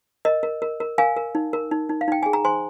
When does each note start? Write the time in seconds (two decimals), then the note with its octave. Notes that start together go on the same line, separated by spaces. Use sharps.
0.25 A#4 D#5
0.43 A#4
0.62 A#4
0.80 A#4
0.98 A#4 F5 G#5
1.17 A#4
1.35 D#4
1.53 A#4
1.71 D#4
1.89 D#4
2.01 F5
2.08 D#4 G5
2.23 G#4 G#5
2.33 A#5
2.45 C5 G#5 C6